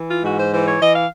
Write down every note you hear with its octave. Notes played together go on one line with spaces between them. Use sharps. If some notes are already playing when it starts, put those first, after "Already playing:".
Already playing: E3
F4
G#2 F#4
C5
E3 C5
C#5
E3 D#5
F5